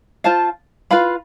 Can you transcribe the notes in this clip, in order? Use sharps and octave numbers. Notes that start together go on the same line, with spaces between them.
F4 C5 F5 A5
F4 B4 F5 B5